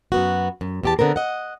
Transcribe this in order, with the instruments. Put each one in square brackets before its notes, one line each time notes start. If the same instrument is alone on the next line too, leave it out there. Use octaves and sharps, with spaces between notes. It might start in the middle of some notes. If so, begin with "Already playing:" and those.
[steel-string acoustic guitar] F#2 B3 F#4
F#2
E2 G4 A5
D3 B3 C4 A#4
D#5 F#5